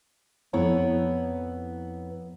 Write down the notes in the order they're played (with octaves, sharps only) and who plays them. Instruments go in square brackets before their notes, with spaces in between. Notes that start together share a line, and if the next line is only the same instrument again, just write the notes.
[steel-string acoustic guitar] F2 B3 E4 B4 C#5 A#5